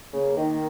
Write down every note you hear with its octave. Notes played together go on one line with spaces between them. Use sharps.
C#3 A#3
D#3